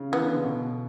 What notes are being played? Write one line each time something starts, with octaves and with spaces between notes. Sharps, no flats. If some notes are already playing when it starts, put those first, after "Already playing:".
Already playing: C#3
E3 B3
D3
C#3
B2